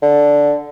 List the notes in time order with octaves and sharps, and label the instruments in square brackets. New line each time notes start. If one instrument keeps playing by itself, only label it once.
[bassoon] D3